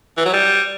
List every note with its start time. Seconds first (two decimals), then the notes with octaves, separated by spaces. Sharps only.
0.17 E3
0.25 F#3
0.33 G3